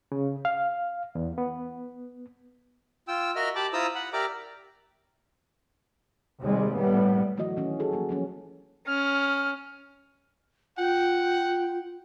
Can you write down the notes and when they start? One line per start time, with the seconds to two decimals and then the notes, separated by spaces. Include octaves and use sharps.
0.12 C#3
0.45 F5
1.15 E2
1.38 B3
3.08 F4 G5 E6
3.36 F#4 A#4 D#5 E5 F6
3.56 G4 A5 B5 D6
3.73 E4 F4 C5 A#5 D#6 E6
3.95 F#5 B5
4.13 G4 A#4 D5 E5 A#5 D6
6.41 D#2 C3 G3 G#3
6.76 A2 G3 B3
7.37 D3 E3 F#3 A3 F#4 D#5
7.57 D#3 E3 C#4
7.80 F#4 G#4 A4
7.92 F3 F#3 A#3
8.09 F3 F#3 C#4
8.87 C#4 F6
10.78 F4 F#5 G5